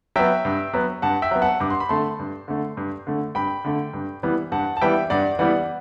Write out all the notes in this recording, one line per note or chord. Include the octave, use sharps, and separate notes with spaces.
F#3 B3 E5 G5
G2
F#3 B3
G2 F#5 A5
E5 G5
F#3 B3
F#5 A5
G2 D6
C6
B5
D3 A3 A5 C6
G2
D3 A3
G2
D3 A3
G2 G5 B5
D3 A3
G2
E3 G3 B3
G2 F#5 A5
A5
E3 G3 B3 E5 G5
G2 D5 F#5
E3 G3 B3 D5 F#5